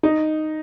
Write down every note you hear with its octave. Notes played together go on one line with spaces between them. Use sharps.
D#4